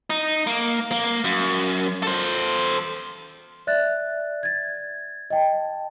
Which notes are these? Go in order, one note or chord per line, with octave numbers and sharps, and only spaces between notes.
D#4
A#3
A#3
F#2
A4 C5
D5 E5 F#6 A6
G#6 A6
D#5 G5 A5